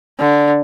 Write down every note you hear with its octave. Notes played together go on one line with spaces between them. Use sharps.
D3